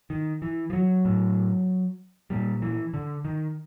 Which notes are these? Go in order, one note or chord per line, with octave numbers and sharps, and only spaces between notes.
D#3
E3
F3
F#3
A2
A#2 G3
E3
D3
D#3